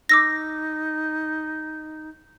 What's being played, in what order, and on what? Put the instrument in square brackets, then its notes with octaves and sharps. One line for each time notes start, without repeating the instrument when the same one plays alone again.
[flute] D#4 [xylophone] D6 E6 A#6